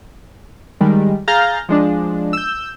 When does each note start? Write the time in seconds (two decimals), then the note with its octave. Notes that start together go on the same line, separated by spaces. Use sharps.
0.81 D#3 G3 G#3
1.28 G#4 F5 A#5 F6 G6 A6
1.69 F3 G#3 D4
2.33 E6 G6